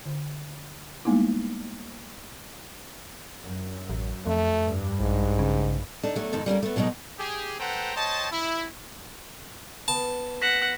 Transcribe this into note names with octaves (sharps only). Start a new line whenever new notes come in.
D3
G3 G#3 A#3 B3 D#4 E4
F#2
A1
F2 A3
G2
A#1 G#2
C#3
D4 D#4 A4
F#3 A3 C#4
F2 G#2 D#3 D#4 A4
G3 A#3 C#4 A#4
A3 B3
B2 F#3 G#3 C4 D#4
G4 G#4
A4 B4 C5 F#5 G5 A#5
C5 C#5 D#5 G5 A5
E4
B3 A5
F#5 A#6 B6 E7